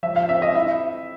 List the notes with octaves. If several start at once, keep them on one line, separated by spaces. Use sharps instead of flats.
F3 E5
F5
C4 E5
D#5
E4 E5